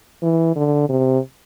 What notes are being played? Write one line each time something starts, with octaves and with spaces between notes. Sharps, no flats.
E3
D3
C3